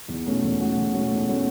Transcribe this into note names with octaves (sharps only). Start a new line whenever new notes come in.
E2
B2 A3 C#4 F#4
E2
B2 A3 C#4 F#4
E2
B2 A3 C#4 F#4
E2
B2 A3 C#4 F#4